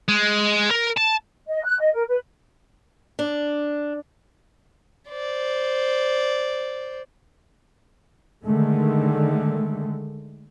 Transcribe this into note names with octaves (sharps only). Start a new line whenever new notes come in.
G#3
A#4
A5
D#5
F#6
D#5
A#4
B4
D4
C5 D5
D3 D#3 G#3 A3